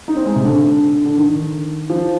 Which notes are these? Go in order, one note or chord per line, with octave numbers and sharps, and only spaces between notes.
D#4
C4
G#3
C3
D3
D3
D#3
F3